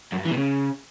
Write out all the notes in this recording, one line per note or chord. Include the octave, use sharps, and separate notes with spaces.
F#2
G2
E3
B2
C#3